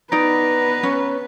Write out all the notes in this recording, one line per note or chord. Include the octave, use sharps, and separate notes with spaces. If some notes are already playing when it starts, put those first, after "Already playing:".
B3 D#4 B4 D5 A#5
C#4